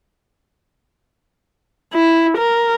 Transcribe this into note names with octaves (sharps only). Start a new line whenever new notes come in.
E4
A#4